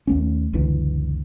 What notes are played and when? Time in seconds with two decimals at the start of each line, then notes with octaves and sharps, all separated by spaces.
0.07 D#2 A3 C#4
0.53 F#1 C#2 D3 E3